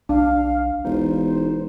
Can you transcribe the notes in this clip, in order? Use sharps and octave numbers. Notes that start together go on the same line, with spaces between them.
B1 D4 F5
E1 D#4 C5